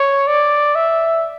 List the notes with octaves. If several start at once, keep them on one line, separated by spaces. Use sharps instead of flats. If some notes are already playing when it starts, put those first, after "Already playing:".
Already playing: C#5
D5
E5